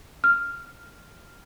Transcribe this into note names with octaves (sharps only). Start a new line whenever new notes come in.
F6